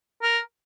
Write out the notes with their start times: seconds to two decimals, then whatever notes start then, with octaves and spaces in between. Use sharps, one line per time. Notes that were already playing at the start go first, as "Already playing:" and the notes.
0.23 A#4